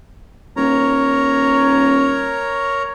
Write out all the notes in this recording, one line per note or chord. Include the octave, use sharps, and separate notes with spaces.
D#1 A#4 C#5 A#5